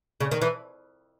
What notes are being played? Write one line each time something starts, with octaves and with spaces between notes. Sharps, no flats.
C#3
D#3
E3